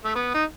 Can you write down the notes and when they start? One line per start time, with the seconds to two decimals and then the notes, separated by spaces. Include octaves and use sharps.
0.05 A3
0.15 B3
0.34 D#4